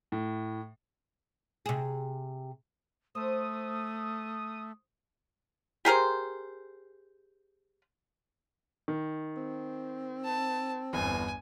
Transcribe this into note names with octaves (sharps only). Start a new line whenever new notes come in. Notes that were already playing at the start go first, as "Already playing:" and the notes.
A2
C3 G#4
A3 C5 D#6
G4 G#4 A#4 C5
D#3
C4
A5
G1 E2 G#5